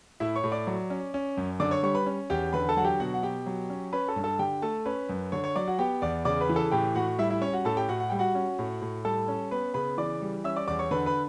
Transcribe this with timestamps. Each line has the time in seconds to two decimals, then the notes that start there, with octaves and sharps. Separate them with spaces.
0.20 A2 E4 E5
0.36 C#5 C#6
0.44 A2
0.52 D5 D6
0.67 F#3
0.90 C#4
1.14 C#4
1.37 F#2
1.60 D3 D5 D6
1.71 C#5 C#6
1.83 G3 C#5 C#6
1.95 B4 B5
2.06 C#4
2.30 E2 G4 G5
2.53 D3 B4 B5
2.69 A4 A5
2.77 F#3 F#5
2.84 G4 G5
3.00 B2 F#4 F#5
3.14 F#5
3.23 B2 G4 G5
3.46 F#3
3.70 C#4
3.93 C#4 B4 B5
4.08 A4 A5
4.16 G2
4.24 A4 A5
4.39 D3 G4 G5
4.62 A3 A4 A5
4.86 C#4 B4 B5
5.09 F#2
5.32 D3 C#5 C#6
5.44 C#5 C#6
5.56 F#3 D5 D6
5.68 F#4 F#5
5.79 B3 G4 G5
6.02 E2 D5 D6
6.25 C#3 D5 D6
6.41 B4 B5
6.49 E3
6.56 A4 A5
6.72 A2 G4 G5
6.95 A2 F#4 F#5
7.18 G3 E4 E5
7.30 E4 E5
7.42 C#4 C#5
7.53 F#4 F#5
7.65 A2 A4 A5
7.77 G4 G5
7.89 A2 F#4 F#5
8.00 F#5
8.10 G3 G5
8.19 F#4 F#5
8.35 C#4
8.59 A2
8.82 A2
9.05 G3 A4 A5
9.28 C#4
9.51 B3 B4 B5
9.74 C#3 B4 B5
9.98 E3 D5 D6
10.22 G3
10.44 C#4 E5 E6
10.56 D5 D6
10.67 E2 D5 D6
10.79 C#5 C#6
10.91 D3 B4 B5
11.06 B4 B5